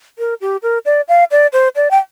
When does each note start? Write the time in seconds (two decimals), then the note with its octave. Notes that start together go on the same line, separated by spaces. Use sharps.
0.19 A#4
0.41 G4
0.63 A#4
0.86 D5
1.09 F5
1.31 D5
1.53 C5
1.76 D5
1.91 G5